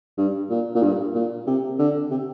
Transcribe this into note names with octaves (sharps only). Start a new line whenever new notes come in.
G2
A#2
A#2
G2
A#2
C3
D3
C3